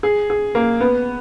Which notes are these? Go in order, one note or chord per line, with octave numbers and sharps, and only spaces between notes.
G#4
G#4
A#3
B3